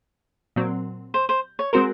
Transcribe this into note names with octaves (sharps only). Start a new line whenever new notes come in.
A#2 F#3 C4
C5
C5
C#5
G#3 C4 F#4 A#4 C5